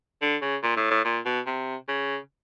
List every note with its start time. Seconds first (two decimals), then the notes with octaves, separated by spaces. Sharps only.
0.22 D3
0.42 C#3
0.63 A#2
0.76 A2
0.91 A2
1.04 A#2
1.25 B2
1.46 C3
1.88 C#3